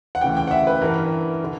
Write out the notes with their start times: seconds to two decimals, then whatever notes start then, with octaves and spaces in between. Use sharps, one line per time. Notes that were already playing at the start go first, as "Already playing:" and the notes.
0.15 F#5
0.21 D2 C#3 E3 G5
0.37 G5
0.47 F#5
0.51 E5
0.67 B4
0.81 G2 E3 A#4
1.44 D3